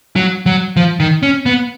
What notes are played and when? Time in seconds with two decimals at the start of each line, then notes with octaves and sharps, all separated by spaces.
0.16 F#3
0.46 F#3
0.76 F3
1.00 D#3
1.23 C#4
1.46 B3